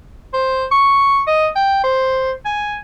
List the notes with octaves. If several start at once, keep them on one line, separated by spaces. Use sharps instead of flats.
C5
C#6
D#5
G5
C5
G#5